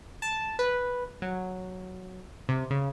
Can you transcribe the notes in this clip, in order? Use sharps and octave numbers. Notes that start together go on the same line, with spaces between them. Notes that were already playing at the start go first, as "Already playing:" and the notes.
A5
B4
F#3
C3
C#3